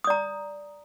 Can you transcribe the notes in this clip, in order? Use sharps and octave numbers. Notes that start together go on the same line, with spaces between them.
D5 A#5 D#6